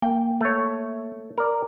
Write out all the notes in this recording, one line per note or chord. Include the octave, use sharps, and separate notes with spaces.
A#3 G5
A3 C#5
A#4 D5